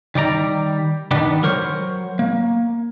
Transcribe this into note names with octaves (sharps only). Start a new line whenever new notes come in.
D#3 G3 D5 A#5
D#3 G3 B3 D4
F#3 A#4 C5 C#5
A#3